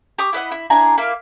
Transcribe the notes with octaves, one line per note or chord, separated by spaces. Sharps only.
G4 C#6 D#6
E4 B4 D#5 F#5
E4
D4 E4 G#4 A#5
A#3 E4 F5